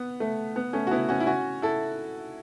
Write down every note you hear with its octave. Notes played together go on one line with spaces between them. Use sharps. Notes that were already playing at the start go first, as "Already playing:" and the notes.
Already playing: B3
A3
B3
A3 C#4
F#4
B3 E4
C#4 F#4
E4
C#4 F#4
E4 A4